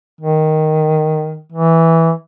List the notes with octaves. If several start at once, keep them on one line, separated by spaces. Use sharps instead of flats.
D#3
E3